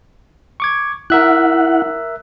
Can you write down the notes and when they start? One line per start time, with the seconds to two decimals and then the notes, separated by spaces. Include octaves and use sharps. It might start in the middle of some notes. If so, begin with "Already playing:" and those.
0.60 C#6 D6 G#6
1.10 E4 A#4 E5 F#5 F#6